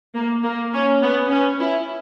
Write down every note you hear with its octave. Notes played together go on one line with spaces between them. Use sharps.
A#3
A#3
C#4
B3
C#4
E4